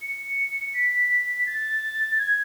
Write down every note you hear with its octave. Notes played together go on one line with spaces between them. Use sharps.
C#7
B6
A6
G#6